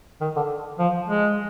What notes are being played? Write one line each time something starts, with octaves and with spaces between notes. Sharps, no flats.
D#3
D3
F3
G#3